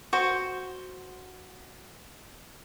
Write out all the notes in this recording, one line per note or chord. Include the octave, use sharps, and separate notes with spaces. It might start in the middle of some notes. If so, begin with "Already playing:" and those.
F#4 C5